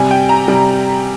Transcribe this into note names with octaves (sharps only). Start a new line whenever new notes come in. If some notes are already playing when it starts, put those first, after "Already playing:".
Already playing: C3 G3 G#5
G5
A#5
C3 G3